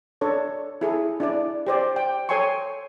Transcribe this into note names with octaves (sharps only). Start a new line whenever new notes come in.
D4 A4 C#5
E4 G#4 A4
D4 E4 D5
G4 C5 D5
G5
A4 C#5 G5 G#5 C6 C#6